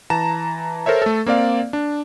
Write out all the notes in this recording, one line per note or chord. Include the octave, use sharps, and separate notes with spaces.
E3 A5 A#5 E7
A4 A#4 C5 C#5 E5
A3 A4
A#3 C4 D5 F5
D4